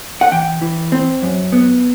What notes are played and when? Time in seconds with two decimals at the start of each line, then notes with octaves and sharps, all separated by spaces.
0.21 F#5
0.32 E3 G5
0.61 E3
0.92 C4
1.23 F#2
1.52 B3